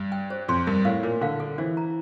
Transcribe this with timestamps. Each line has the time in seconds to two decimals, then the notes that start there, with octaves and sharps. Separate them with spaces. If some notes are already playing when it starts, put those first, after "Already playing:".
Already playing: G2
0.12 G5
0.30 C5
0.48 F2 C6
0.67 G2 A#4
0.85 A2 F5
1.03 A#2 A#4
1.21 D3 F5
1.40 A4
1.58 E3 C5
1.77 A#5